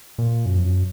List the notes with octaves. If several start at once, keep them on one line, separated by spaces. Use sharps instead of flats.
A#2
F#2
F2
F#2